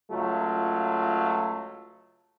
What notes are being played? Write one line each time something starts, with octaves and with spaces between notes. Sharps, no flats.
C#2 F#3 A3 F4